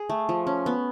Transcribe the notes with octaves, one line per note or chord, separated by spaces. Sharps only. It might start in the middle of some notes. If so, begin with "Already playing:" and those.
Already playing: G#4
A3
F3
C#4
B3